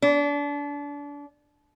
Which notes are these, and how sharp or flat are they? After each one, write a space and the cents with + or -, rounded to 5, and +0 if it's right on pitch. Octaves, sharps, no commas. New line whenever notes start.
D4 -30